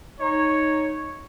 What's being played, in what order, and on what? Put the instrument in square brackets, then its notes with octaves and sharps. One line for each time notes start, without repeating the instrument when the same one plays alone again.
[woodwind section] D#4 [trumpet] C#5